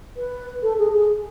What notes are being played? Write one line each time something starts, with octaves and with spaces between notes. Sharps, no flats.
B4
A4
G#4
G#4